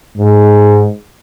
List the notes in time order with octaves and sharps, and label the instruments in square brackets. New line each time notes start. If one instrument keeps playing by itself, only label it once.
[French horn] G#2